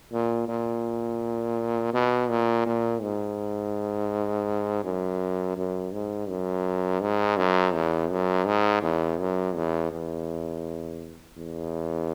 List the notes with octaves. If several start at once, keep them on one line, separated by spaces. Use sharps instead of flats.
A#2
A#2
B2
A#2
A#2
G#2
F#2
F#2
G#2
F#2
G#2
F#2
E2
F#2
G#2
E2
F#2
E2
E2
E2